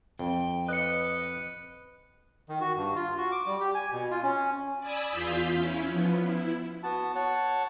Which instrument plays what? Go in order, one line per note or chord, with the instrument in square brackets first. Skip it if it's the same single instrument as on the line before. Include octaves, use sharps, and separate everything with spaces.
[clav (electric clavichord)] F2 [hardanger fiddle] G5
[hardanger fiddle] B4 [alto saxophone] D#5 [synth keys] F#6 C#7
[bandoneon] D#3
F#4
G2
F4
F#4
D6
G3
G4
G#5
B2
F4
C#4
[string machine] D5 G#5 B5 D#6 E6
E2 F4 F5 G6 B6
C#4 E4
F3 B3
E4
[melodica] B3 F#4 A5
C#5 F#5 A5